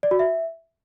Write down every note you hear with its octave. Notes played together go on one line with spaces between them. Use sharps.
D5
F#4
E5